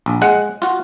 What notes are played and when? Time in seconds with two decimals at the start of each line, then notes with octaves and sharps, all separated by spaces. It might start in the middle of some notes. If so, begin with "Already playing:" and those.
0.06 A#1
0.22 G#3 F#5
0.62 F4 F#4